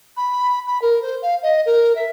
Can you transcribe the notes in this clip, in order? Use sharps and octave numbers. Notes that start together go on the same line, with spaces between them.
B5
B5
A#4
C5
F5
D#5
A#4
E5